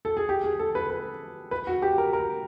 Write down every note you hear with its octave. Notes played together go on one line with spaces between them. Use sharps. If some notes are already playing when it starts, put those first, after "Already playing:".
A4
G#4
G4
G#4
A4
B4
B4
B4
F#4
G4
A#4
A#4